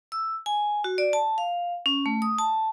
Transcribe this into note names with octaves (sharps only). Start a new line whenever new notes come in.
E6
G#5
F#4
D5
A5
F5
C#4
A3
D#6
A5